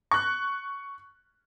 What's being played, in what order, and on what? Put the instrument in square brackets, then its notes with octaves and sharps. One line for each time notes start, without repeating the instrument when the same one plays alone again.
[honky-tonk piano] C#6 F#6